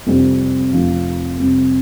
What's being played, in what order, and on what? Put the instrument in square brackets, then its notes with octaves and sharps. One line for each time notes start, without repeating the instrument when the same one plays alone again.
[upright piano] F2 C3 G3 C4
F1 F2 F3 C4
F2 C3 G3 C4